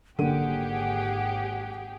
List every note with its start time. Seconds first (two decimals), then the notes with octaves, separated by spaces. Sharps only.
0.19 G#1 D3 A#3 G4 G#4 F#5 D#7